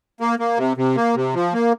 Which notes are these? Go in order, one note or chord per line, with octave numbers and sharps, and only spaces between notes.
A#3
A#3
C3
C3
A#3
C3
F3
A#3